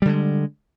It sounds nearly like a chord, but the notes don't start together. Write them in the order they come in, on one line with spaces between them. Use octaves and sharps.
G3 D3 G#3